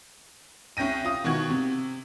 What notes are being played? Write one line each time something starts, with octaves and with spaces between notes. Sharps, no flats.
C2 C#4 G5 A#6 D#7
F4 D#6
B2 D#3 F#4 C#6 G#6
C3